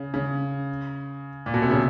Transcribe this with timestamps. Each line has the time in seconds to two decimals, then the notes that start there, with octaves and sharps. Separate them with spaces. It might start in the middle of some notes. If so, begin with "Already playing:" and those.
Already playing: C#3
0.14 C#3
1.46 A#2
1.54 B2
1.62 C3
1.71 C#3